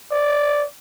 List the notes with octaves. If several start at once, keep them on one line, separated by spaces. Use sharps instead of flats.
D5